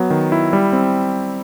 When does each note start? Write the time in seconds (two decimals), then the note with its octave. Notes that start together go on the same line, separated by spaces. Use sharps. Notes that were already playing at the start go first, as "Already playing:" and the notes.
Already playing: F#3 B3
0.10 D#3
0.32 E4
0.53 G3
0.73 C4